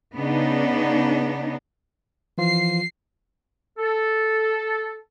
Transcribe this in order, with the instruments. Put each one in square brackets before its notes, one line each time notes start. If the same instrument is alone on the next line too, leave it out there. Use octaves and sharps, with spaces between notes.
[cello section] C#3 B3 D4 D#4
[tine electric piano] E3 F3 F4 [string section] C7
[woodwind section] A4